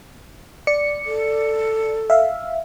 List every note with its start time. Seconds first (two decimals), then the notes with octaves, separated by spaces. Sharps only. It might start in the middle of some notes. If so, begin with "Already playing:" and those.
0.67 D5 C#7
1.06 A4
2.10 E5 F5